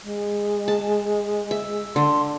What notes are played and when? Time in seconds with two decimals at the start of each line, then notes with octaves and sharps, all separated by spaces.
0.03 G#3
0.68 A5
1.51 E5
1.96 D3 C6